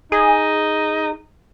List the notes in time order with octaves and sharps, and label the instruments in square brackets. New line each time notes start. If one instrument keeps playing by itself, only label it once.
[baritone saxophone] D#4 [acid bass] G#4